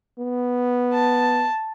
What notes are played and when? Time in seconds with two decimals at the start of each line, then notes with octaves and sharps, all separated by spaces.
0.19 B3
0.93 A5